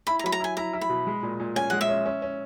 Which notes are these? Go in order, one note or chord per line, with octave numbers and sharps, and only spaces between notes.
E4 B5
A#5
F#3 B5
A#5
E4 G#5
E4 A#5
E4
B5
B2
G#3
A#2
A#2
C#4 G#5
G#3 F#5
E5
C#4
C#4
C#4